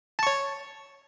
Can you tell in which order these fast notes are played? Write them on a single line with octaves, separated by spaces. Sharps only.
A5 C#6 C#5